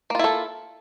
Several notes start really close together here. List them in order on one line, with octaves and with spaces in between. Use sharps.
A#3 F4 E4 A4